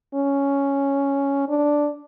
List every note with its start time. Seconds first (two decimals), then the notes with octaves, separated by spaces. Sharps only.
0.14 C#4
1.48 D4